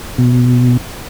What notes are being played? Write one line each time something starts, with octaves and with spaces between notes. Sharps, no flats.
B2